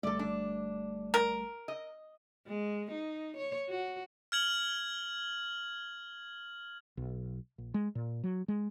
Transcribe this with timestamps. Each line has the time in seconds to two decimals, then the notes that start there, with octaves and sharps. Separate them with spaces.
0.03 G1 G3 A3 A4 D5
0.19 D4
1.14 A#4
1.68 D#5
2.47 G#3
2.91 D#4
3.37 C#5
3.69 F#4
4.32 F6 G#6 F#7
6.97 B1
7.58 A#1
7.74 G#3
7.95 A#2
8.24 F#3
8.48 G#3